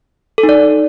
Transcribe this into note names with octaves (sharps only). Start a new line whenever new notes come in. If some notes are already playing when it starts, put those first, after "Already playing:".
A4
D#4
D5